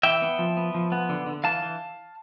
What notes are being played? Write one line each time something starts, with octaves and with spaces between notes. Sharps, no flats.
E3 E5 G5
B3
F3
B3
F3
B3
D3
D3
E3 F5 A5
E3